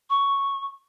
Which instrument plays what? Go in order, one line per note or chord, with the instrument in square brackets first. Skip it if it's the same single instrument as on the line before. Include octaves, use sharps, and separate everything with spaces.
[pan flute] C#6